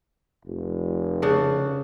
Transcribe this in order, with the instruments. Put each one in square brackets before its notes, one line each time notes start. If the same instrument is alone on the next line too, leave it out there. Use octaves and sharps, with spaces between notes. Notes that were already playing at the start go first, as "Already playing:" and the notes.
[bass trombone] F1
[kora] C#3 D4